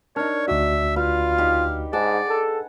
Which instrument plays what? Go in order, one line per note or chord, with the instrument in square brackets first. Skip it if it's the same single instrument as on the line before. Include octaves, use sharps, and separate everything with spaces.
[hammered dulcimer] D4 D#4 [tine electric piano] A#4 A5 F6 [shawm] C#5
[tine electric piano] D2 F#4 [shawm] E5 [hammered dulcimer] D6
[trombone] F4 [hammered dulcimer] B4 [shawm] F5
[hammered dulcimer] D#4 G4
[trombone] G#2 [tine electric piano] G#4 [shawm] D5 [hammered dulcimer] F#5 G#5 A5
[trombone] A4